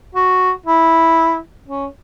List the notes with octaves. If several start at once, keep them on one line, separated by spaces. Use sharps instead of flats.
F#4
E4
C#4